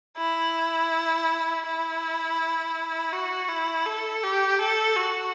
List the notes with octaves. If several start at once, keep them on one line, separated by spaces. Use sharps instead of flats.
E4
E4
F#4
E4
A4
G4
A4
F#4